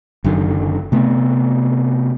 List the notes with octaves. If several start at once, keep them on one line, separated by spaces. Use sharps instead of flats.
F#1 F#2 D3 D#3
C3 A3 B3